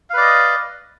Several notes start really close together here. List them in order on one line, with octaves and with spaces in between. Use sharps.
F5 B4 D5 D#5